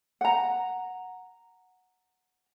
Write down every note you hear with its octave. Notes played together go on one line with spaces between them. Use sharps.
F#5 A#5